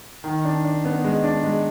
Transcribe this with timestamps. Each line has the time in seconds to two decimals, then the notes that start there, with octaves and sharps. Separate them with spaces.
0.24 D#3
0.45 D4
0.64 D4
0.85 B3
1.04 G#3
1.24 D4
1.44 G#3